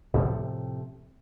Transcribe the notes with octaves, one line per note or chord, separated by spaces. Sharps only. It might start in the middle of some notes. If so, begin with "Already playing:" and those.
A2 C3 F3 A3